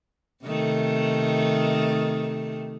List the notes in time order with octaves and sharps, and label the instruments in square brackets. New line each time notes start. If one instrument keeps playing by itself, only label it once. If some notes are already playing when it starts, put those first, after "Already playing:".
[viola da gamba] C3 D#3 A3